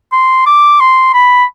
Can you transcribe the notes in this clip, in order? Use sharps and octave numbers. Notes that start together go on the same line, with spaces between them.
C6
D6
C6
B5